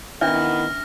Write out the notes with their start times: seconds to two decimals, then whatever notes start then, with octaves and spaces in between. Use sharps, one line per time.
0.21 D#3 B3 C#4 D4 E4 E5 F6 A#6